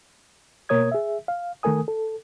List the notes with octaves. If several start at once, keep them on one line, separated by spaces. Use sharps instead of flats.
B2 A#3 A#4 C#5 D#6 G#6
G#4 E5
F5
D#3 A3 A4 A#4 G#5 D#6
A4